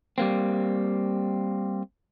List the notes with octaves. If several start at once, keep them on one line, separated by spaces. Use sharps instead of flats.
G3 A#3 C4